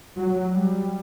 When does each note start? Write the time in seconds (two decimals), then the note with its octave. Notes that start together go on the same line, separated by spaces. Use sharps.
0.17 F#3
0.51 G3